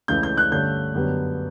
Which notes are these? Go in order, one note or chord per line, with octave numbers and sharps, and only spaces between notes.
C#2 C#3 E3 A3 C#4 G6
G6
F#6
G2 D3 A3 C#4 G6
F#2 D3 G3 B3